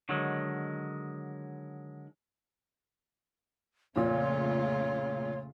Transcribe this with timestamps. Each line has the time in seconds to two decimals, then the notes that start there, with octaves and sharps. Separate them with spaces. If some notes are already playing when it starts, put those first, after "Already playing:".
0.09 D3 D#3 F#3 G#3
3.96 F2 A#2 C#3 A3 F4 C#5